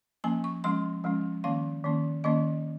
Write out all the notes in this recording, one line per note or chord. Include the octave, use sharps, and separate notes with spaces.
F3 A#3 C#4 G#5
C#6
F3 G#3 C#4 C6
F3 G#3 C#4
D#3 A#3 C#4 F5
D#3 A#3 C#4
D#3 A#3 C#4 D#5